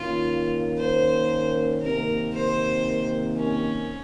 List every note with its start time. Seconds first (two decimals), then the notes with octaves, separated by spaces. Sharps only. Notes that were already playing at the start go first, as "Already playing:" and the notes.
Already playing: D#3 A#3 C#4 F4
0.78 C5
1.82 C3 D#3 A#3 A#4
2.33 C5
3.37 C#4